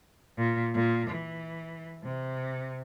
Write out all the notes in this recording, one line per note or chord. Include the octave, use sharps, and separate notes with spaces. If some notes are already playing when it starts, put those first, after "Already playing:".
A#2
A#2
E3
C3